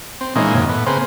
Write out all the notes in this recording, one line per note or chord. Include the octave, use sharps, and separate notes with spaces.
C4
A#2 E3 G#3 A#3 C#4 D#4
F#2 C3 D#3
A2 B3
C#3 A#3 C4 G#4 B4 C5